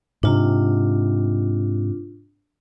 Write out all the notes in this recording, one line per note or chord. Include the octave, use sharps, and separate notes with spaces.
G#2 C3 D4 F4